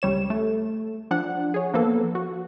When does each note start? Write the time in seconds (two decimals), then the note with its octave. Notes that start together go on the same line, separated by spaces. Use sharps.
0.02 C#2 G3 C#5 E7
0.30 A3
1.11 F3 D4 F#5
1.54 G#4 C#5
1.74 F3 A#3 B3 A4
2.15 F#4